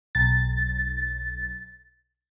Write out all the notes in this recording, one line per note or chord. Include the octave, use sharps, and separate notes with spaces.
B1 A6